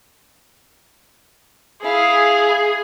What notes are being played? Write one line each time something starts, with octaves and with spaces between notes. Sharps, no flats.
E4 G#4 F5